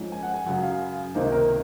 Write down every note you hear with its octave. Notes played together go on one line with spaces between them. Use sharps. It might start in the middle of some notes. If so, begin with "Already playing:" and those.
Already playing: G#2 F3 G#3 C#4
G#5
F#5
G#5
F#2 C#3 F#3 F#5
F5
C#2 C3 D#3 A#3 D#4 C5
A#4